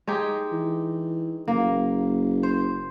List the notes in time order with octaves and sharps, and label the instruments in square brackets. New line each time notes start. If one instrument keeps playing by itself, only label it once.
[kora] G#3 D#4 G4
[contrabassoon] E3
[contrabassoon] F#1 [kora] A#3
[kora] C5